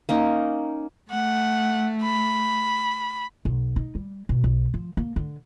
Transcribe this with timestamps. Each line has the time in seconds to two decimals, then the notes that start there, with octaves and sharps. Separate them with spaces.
0.09 A#3 C#4 D#4
1.11 A3 F#5
2.03 B5
3.45 B1
3.76 D#4
3.95 G3
4.29 B2
4.44 B1
4.74 F3
4.97 A#3
5.16 D3